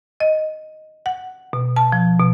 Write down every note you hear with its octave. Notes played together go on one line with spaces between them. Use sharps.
D#5
F#5
B2
A5
F3
B2